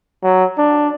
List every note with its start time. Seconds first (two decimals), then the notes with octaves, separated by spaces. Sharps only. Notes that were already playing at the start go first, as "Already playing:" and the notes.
0.23 F#3
0.58 D4